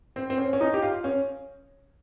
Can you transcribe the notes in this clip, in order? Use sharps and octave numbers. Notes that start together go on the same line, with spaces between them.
C4
C4
C#4
C#4
D#4
G4
F4
C#4